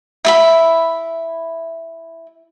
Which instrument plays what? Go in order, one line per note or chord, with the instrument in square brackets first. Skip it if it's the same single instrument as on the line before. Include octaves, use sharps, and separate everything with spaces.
[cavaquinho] E4 E5 B5